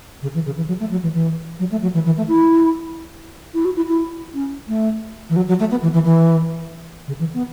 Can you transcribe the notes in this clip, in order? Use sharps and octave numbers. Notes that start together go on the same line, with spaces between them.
C#3
E3
C#3
E3
F#3
A3
F#3
E3
E3
F#3
A3
F#3
E3
E3
A3
E4
E4
F#4
E4
E4
C#4
A3
E3
F#3
F#3
A3
B3
E3
E3
E3
C#3
E3
B3